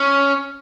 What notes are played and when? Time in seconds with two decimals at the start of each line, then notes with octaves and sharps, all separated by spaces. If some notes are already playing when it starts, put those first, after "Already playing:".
Already playing: C#4